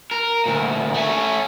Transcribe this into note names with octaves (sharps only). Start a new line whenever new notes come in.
A#4
D2 A#2
A3 C#4